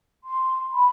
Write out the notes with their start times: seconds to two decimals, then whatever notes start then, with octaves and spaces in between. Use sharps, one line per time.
0.25 C6
0.72 B5